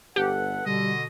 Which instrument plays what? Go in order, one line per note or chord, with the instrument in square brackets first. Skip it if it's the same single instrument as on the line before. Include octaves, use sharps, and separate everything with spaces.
[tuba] G1 [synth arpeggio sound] G4 [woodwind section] A4 B4 F#5
[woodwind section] B2 D3 [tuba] G3 [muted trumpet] D#5